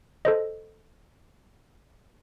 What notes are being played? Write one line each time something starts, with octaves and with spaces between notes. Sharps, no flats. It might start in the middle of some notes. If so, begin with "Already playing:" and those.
A4 C5 D#5